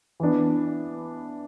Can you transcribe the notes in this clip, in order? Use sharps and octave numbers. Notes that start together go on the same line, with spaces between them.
E3 B3 D4